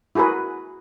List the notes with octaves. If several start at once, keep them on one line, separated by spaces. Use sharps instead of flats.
E4 F#4 G#4 A#4 B4